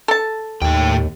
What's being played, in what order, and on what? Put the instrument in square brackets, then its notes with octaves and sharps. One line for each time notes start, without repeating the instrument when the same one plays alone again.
[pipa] A4 A5
[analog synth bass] D#2 [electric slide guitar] A2 G5